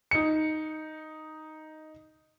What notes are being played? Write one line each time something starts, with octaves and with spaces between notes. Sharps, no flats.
D#4 C#7